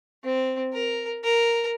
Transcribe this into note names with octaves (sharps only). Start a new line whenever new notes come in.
C4
A#4
A#4